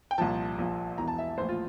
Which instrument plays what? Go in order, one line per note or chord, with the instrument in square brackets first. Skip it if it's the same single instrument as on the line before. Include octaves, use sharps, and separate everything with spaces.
[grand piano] G5
C2 A#2 F3 A5
A#1 A#2 F3
E1 E2 E3 A#5
A5
E5
A#1 A2 E3 C5
F4